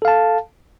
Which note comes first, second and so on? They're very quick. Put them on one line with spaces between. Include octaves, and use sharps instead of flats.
A4 F5 A5